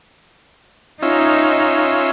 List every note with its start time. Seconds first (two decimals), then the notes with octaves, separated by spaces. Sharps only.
1.02 C#4 D#4 F4 E5